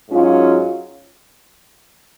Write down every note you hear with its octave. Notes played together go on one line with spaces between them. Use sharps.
G#2 F#3 C#4 F4